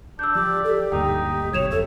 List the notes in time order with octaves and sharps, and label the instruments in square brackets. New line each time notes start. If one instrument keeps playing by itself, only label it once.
[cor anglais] D4 [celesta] E6 G6
[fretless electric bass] F3 [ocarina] G4 [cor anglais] D5
[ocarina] G4 [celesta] A4
[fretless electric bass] D2 G2 A#2 [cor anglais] D#4 [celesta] G5
[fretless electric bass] G1 B2 F#3 [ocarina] C#5 [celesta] G#6 E7 F7
[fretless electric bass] E1 F2 [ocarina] A4 [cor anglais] E5